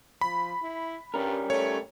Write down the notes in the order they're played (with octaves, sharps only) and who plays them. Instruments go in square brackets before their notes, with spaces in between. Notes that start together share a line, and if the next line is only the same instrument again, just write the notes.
[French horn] F3 [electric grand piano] B5
[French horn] E4
[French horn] G2 [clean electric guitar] G3 C#4 A#4
[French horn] A3 [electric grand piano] C#5